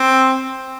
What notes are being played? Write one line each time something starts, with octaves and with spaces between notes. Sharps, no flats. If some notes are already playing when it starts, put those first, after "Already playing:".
Already playing: C4